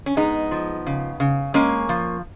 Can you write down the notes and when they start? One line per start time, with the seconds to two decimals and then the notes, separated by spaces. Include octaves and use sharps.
0.06 C#4
0.17 G#3 B3 D#4
0.51 F3
0.87 C#3
1.20 C#3
1.54 G#3 A#3 C#4
1.89 F3